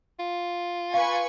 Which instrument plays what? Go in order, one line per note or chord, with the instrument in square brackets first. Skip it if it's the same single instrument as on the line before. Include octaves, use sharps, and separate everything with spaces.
[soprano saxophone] F4
[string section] B4 G#5 C#6 [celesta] F5